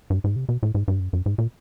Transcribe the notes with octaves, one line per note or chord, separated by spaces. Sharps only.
G2
G#2
C3
B2
A2
G#2
G2
F#2
F#2
G#2
A#2